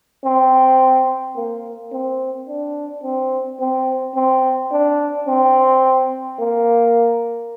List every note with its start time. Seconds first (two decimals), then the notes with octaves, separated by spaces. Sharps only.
0.25 C4
1.36 A#3
1.93 C4
2.48 D4
3.03 C4
3.60 C4
4.15 C4
4.72 D4
5.27 C4
6.39 A#3